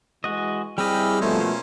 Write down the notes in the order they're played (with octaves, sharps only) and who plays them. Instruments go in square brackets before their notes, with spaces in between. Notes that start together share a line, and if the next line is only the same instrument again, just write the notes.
[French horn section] E3 G#3 [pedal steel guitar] F#4 D#5
[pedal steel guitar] G3 C4 D#5 [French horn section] E4 G#4 [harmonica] G4 B5 F6
[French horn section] B2 [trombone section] F3 A3 [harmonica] A#3 C#4 C5